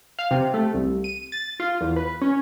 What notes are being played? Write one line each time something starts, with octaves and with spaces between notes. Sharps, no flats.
F5
C3
A3
C2
D#7
A6
F4
E2
B4
C#4